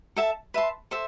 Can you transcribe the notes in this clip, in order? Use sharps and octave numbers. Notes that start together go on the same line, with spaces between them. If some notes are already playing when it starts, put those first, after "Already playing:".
A4 E5 A5
B4 E5 A5 C6
A4 C5 E5